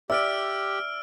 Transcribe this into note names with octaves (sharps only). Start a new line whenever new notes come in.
G4 D5 E5 E6 F6 D7